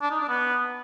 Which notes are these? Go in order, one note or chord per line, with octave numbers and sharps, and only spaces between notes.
D4
D#4
D4
B3